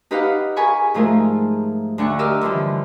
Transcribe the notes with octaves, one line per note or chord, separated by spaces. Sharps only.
D#4 G4 B4 D#5 F5 F#5
G#4 A#4 G#5 B5 C#6
G#2 F3 A3 F4 G#4 A#4
D2 D4 F#5 C#6
G4 A#4 D#5 D6 E6 F6
G2 D3 E3 F3